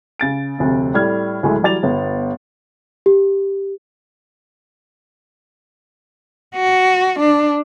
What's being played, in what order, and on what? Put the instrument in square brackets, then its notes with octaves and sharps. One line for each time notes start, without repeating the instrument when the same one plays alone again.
[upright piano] C#3 A6 D7
F1 D2 C3
A2 G3 F6 G#6
D2 A2 F#3 G#3 A3
E3 F#3 G3 D5 A6 F7
G1 B3
[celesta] G4
[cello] F#4
D4